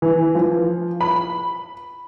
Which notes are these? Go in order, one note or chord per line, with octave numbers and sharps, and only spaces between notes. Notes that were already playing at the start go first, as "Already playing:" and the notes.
E3
F3
B5